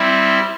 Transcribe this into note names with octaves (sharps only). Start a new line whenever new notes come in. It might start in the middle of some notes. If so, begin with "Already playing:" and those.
Already playing: G3 C4 E4